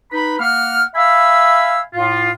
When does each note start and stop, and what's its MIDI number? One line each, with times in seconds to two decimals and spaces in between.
0.11 0.35 63
0.11 0.35 71
0.11 0.35 83
0.39 0.82 58
0.39 0.82 78
0.39 0.82 89
0.95 1.79 76
0.95 1.79 77
0.95 1.79 80
0.95 1.79 83
0.95 1.79 88
1.93 2.29 45
1.93 2.29 65